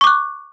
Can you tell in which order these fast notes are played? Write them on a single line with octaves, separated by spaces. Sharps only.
C#6 D6 F#6